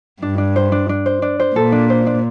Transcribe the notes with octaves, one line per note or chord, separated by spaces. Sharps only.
G2 D4
D4
C5
D4
D4
C5
D4
C5
A#2 A4
D4
C5
D4